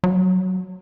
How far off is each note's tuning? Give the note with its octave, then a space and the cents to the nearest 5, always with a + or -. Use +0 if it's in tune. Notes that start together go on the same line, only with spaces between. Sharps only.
F#3 +5